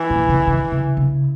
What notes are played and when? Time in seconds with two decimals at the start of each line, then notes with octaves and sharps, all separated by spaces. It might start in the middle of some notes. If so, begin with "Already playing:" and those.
Already playing: E3
0.10 A#2
0.28 C#3
0.47 D#3
0.72 C#3
0.97 C#3